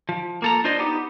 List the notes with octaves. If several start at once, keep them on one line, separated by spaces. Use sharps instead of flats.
F3
A#3 A4 A#5
D4 F4 C5 D5 D#5
B3 D#4 G4